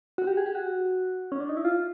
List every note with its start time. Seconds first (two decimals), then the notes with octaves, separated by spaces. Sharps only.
0.18 F#4
0.27 G4
0.37 G#4
0.46 G4
0.55 F#4
1.32 C#4
1.40 D4
1.49 D#4
1.57 E4
1.65 F4